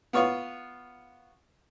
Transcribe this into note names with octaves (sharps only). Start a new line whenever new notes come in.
B3 F4 C#5